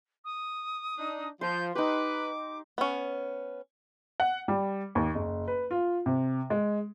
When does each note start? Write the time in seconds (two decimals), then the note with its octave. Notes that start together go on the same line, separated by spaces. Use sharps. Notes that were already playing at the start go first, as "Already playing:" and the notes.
0.24 D#6
0.98 D4 D#4
1.41 F3 C6 G6
1.75 D#4 G4 B4 D6
2.78 B3 C#4
4.20 F#5
4.48 G3
4.95 D#2
5.15 F#1
5.48 B4
5.71 F4
6.06 C3
6.50 G#3